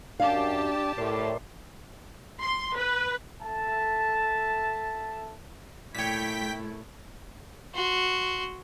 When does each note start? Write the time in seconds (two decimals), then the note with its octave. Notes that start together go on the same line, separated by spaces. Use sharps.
0.20 F#2 D4 G4 F5 A5
0.98 A2 A#4 D5 C6
2.40 C6
2.77 B4
3.43 A4 E5 A5
5.95 A#2 A3 E4 C#5 G5 B6
7.75 F#4 C6